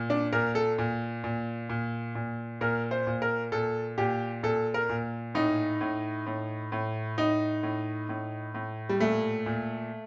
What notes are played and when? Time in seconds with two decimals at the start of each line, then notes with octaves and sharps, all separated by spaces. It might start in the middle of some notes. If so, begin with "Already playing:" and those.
Already playing: A#2
0.10 D4
0.32 A#2 A#4
0.55 A4
0.78 A#2
1.24 A#2
1.69 A#2
2.15 A#2
2.61 A#2 A#4
2.91 C5
3.07 A#2
3.22 A#4
3.52 A#2 A4
3.98 A#2 G4
4.43 A#2 A4
4.74 A#4
4.89 A#2
5.35 A2 D#4
5.81 A2
6.26 A2
6.72 A2
7.18 A2 D#4
7.63 A2
8.09 A2
8.54 A2
8.89 G3
9.00 A#2 A3
9.46 A#2